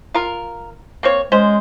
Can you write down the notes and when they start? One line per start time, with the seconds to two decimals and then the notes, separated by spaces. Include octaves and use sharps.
0.14 F4 A#4
1.03 A#3 C4 C#5
1.32 G#3 C#4 C5